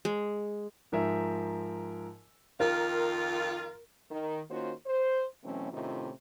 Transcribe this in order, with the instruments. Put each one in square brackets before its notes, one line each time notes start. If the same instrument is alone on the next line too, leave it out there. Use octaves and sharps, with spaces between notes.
[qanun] G#3
[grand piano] G#2 F3 A#4 E5 G#5
[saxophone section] F2 D#3 F4 [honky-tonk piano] A#4
[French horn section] D#3
D#3 A#3 C#4 F4 F#4 C5
C5
B2 E3 F#3 A3 C4 C#4
A2 C3 D#3 C#4 D#4 F4